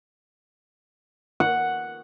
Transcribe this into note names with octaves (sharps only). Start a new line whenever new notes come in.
F#5